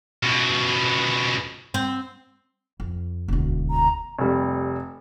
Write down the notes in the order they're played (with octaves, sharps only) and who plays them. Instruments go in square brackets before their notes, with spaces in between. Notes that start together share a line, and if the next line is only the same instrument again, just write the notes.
[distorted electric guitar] C#2 B2
[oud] C4
[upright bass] F2
E1 D2
[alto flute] A#5
[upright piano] F1 G3